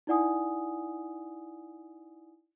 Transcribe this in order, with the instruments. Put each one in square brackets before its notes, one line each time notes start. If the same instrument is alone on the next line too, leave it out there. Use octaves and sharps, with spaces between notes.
[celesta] D#4 E4 D5 F#5 G#5 D#6